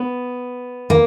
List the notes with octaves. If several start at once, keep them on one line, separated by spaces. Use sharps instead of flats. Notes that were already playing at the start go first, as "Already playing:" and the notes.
Already playing: B3
A#3